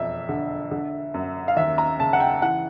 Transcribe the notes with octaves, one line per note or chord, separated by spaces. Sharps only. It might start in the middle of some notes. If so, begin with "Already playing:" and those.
Already playing: E1 F2 E5
D3
D3
F#2
F5
D#2 E5
A#5
C#3 A5
F#5
G5
E3 F#5